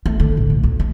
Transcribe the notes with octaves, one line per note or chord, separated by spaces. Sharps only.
A3
D3
A2
A#1
D2
A3